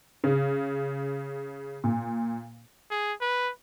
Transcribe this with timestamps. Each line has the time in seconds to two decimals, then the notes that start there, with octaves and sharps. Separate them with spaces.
0.24 C#3
1.84 A#2
2.91 G#4
3.21 B4